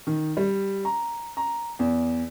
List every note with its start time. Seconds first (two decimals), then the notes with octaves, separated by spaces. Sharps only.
0.07 D#3
0.37 G3
0.85 A#5
1.37 A#5
1.79 E2